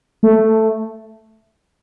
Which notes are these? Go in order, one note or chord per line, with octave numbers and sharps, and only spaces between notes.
A3